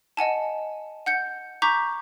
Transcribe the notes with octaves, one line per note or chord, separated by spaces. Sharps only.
D#5 F#5 G#5 A5
F#5 G6 C#7
A#5 C#6 D6 G6 B6